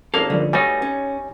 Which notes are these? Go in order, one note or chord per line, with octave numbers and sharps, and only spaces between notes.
G#1 A#3 C#4 A4 F5
G2 D3 F3 A3 C#4
G3 A3 B3 D#4 F#4 C#5 G#5
C#4